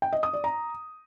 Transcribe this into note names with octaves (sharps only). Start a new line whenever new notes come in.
G5
D#5
D#6
D5
A#5